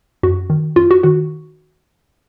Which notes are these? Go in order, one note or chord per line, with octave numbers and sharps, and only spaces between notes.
F#2 F#4
D#3
F#2 F4
F#4
D#3 F#4